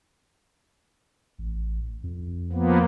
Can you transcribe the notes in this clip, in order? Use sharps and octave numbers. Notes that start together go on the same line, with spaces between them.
A1
F2
F3 A#3 B3